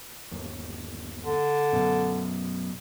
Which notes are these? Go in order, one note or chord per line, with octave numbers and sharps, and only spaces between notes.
G1 D#2
D3
F#2 B2